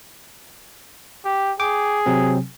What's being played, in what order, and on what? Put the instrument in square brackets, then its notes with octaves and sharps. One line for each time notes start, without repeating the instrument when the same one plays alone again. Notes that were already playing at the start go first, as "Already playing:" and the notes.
[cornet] G4
[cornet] G#4 [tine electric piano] G5 D6
[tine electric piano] C3 F#3 C4